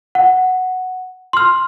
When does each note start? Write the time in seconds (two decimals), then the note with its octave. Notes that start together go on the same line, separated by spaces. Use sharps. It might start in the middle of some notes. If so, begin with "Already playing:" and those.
0.15 F#5
1.33 C6 F6